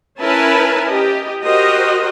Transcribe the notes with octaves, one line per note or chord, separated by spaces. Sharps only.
C#4 E4 A#4 B4 G#5 A5
G4 D#5
F#4 G4 A#4 C5 D#5